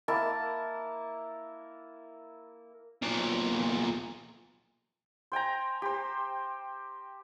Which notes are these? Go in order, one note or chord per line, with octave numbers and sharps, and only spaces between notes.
A#3 E4 A5
B1 A#2
C5 G5 G#5 A#5
G4 C5